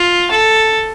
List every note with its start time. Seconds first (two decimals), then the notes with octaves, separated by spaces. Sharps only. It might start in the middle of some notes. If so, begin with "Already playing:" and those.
Already playing: F4
0.31 A4